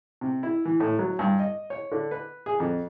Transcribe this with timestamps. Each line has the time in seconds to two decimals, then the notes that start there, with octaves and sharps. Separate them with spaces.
0.21 C3
0.43 E4
0.65 E3
0.80 A2
0.99 F#3
1.19 G2
1.39 D#5
1.70 C#5
1.92 D3
2.11 B4
2.46 G#4
2.60 F2